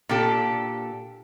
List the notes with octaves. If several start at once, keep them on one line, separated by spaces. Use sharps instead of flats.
A#2 D4 G4 A4